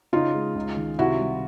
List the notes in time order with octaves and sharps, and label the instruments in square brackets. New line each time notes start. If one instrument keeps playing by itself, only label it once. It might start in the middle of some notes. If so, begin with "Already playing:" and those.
[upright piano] C#3 [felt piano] D#4 F4
[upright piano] G#3
C#2
D#3
[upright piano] C3 [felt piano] E4 F#4
[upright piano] G3